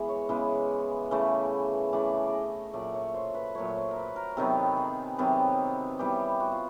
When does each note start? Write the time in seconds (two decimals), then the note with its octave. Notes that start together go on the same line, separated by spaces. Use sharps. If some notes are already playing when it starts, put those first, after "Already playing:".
Already playing: E3 G#3 B3
0.09 C#5
0.29 C#3 E3 G#3 B3
1.11 C#3 E3 A3
1.93 C#3 E3 A3 D5
2.26 D5
2.33 D#5
2.73 A#2 F#3 A3 D5
2.94 C#5
3.14 C5
3.35 B4
3.55 A#2 F#3 A3 C#5
3.76 C5
3.91 A#4
3.96 B4
4.16 A#4
4.37 C3 D#3 F#3 B3 A4
4.77 G#4
5.18 C3 D#3 F#3 B3
5.99 E3 G3 B3 G4
6.40 F#4
6.52 F4